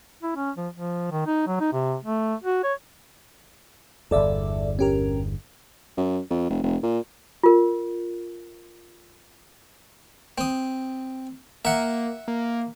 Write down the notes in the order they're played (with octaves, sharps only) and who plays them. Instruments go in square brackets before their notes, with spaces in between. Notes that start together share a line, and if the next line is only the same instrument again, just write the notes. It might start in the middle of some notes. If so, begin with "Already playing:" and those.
[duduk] E4
C#4
F3
F3
D#3
D#4
F#3
D#4
C3
A3
F#4
C#5
[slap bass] G1 E2 [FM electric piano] A4 D5 E5
[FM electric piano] C#4 G4 A#4
[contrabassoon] F#2
F2
F1
F1
A#2
[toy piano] F4 A#4
[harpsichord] C4 D#6
[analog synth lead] A#3 [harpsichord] E5 F#5
[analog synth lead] A#3